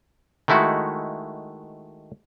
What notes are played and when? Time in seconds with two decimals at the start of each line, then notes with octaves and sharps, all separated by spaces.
0.48 D#3 G#3 A3 E4 F#4